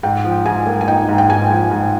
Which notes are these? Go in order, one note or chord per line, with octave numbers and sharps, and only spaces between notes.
G#2 G5
F3
G#2 G#5
A#3
G#5
D#4 G5
G#2
G5
G#2 G#5
F3
G#2